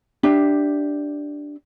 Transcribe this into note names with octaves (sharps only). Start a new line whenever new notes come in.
D4 G4 E5